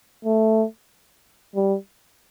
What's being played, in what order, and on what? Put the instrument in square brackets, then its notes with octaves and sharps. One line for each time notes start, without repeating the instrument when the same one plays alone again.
[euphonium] A3
G3